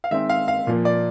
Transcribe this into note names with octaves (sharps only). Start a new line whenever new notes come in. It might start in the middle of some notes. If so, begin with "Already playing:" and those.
F5
D#3 G#3 C4 D#4 E5
F5
F5
A#2 F3 A#3
D5